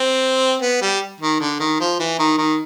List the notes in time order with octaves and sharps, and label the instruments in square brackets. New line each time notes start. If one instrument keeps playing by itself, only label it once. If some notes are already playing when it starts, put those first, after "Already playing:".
Already playing: [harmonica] C4
B3
G3
D#3
D3
D#3
F3
E3
D#3
D#3